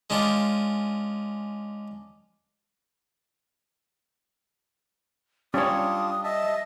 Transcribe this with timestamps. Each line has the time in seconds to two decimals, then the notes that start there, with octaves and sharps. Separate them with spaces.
0.10 G#3 C#4 D4 F4
5.54 G3 C#4 D4 F4 C#5 D#6
6.24 D#5 E5 A5